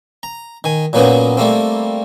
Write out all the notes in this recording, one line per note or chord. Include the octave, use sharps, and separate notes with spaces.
A#5
D#3 G#5
A#2 F#3 A#3 B3 C#4 F#4
G3 A3 A#3 C4